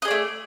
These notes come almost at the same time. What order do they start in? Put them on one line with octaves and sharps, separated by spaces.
D#5 G#4 D5 A3